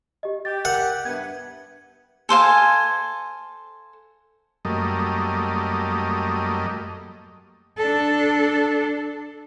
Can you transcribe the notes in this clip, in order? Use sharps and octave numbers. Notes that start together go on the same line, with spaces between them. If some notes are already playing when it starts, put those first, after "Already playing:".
G4 D#5
G4 A6
A#4 F#5
G2 B3 E5 G#6
A4 C5 F5 G#5
F#2 G3 A3 A#3 D#5
D4 A4